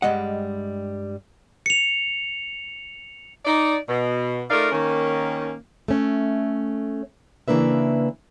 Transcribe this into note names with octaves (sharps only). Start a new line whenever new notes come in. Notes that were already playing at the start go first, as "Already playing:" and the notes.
G2 G3 G#3 D#5 F#5
C#7 F7
D#4 D5
B2
A3 D#4 F4 A#4 D5 F5
D#3 A#3 C#4
A3 C#4
C#3 E3 A#3 D4 B4 E5